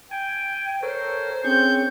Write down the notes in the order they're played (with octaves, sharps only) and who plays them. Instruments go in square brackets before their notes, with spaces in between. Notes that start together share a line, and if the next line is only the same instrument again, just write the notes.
[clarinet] G5 [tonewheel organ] G#5
[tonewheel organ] A4 A#4 C#5 [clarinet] C5
[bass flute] C4 [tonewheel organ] C#4 G#4 C#6 [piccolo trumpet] G6